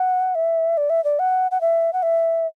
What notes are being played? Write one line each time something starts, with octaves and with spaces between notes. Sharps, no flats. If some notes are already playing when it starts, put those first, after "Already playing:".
Already playing: F#5
E5
D5
E5
D5
F#5
F#5
E5
F#5
E5